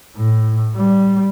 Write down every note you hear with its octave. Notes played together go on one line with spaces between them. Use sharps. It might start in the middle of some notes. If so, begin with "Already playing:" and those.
A2
G3